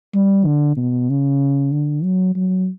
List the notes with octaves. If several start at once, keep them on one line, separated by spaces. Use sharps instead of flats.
G3
D3
B2
C#3
D3
F#3
F#3